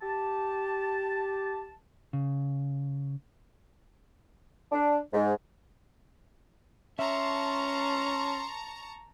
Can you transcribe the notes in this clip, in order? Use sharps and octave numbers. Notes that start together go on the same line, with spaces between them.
G4 A5
C#3
D4
G#2
C#4 E5 A5 A#5 C6 C#6